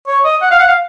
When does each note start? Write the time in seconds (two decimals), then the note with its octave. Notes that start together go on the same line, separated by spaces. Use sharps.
0.07 C#5
0.24 D#5
0.42 F#5
0.51 F5
0.59 F#5
0.68 F5